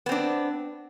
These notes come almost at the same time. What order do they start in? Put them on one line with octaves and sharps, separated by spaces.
B3 C4 D4